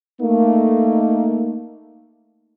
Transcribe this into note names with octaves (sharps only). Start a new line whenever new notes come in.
A3 A#3 D#4